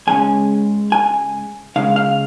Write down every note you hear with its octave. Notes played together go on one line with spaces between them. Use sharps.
C#2 C#3 G#3 C#4 G#5
G#5
C#2 C#3 G#3 F5
F5